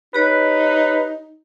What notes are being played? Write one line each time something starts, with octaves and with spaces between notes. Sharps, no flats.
D#4 G4 B4 C#5